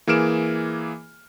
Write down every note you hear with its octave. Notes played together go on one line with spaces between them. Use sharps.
E3 A#3 G#4 F6 D7 E7